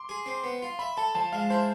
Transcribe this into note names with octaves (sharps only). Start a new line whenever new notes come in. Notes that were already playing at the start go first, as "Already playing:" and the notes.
Already playing: C6 D6
G#4
C4
B3
F4
E5 B5
A4 A5
F3 A5
G#3 F5
E4 C5